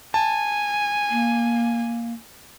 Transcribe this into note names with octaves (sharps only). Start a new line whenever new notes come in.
G#5 A5
A#3